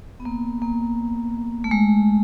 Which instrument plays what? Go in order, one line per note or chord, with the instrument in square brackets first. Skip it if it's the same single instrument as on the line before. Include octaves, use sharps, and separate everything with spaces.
[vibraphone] B3
A#3
A#3
A3
G#3